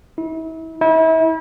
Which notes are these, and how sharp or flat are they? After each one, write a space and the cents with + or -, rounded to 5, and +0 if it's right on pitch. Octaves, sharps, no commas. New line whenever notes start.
E4 -35
E4 -35